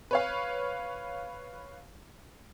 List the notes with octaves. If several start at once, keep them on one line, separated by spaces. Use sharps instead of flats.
B4 C#5 F5